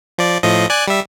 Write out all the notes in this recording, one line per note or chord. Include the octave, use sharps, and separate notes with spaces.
F3 D5
A2 F3 D#5
D5 G#5 F#6
G3 E5